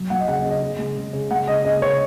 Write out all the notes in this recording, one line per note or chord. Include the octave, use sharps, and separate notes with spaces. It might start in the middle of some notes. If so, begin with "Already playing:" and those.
Already playing: F#3
F#3 F#5
D#5
C#3 F#5
D#5
C#3
D#5
C#3
G#3
C#3
C#3
G#3 F#5
C#3 D#5
C#3 D#5
C#3 C#5